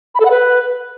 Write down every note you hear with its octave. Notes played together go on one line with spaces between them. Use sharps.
B5
A4
F#5
B4